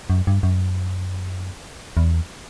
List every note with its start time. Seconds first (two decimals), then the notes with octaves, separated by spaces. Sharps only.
0.10 F#2
0.27 G2
0.43 F#2
1.97 E2